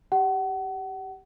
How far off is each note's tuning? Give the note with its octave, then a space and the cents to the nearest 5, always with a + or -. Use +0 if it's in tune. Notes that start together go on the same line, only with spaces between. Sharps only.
G4 +0 F#5 +35